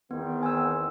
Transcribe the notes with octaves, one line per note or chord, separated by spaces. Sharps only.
E2 D#3 B3 C4
G#5 E6